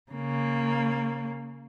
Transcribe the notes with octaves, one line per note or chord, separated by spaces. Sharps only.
C#3 A#3